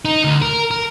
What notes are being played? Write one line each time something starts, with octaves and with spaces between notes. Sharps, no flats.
D#4
D2
A#4
A#4